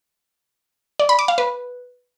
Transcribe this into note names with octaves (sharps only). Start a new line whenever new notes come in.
D5
B5
D6
F5
B4